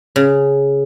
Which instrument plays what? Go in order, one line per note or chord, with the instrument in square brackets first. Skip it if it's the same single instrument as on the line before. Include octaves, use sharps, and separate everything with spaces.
[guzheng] C#3